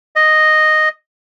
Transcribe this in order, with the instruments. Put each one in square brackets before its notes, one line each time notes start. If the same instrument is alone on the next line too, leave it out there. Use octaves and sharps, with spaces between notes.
[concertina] D#5